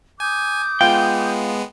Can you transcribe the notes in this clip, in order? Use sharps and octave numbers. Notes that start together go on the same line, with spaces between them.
G#5 D6 D#6 G6
G#3 B3 F4 G5